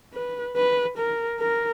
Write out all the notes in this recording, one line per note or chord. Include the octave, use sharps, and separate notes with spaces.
B4
B4
A#4
A#4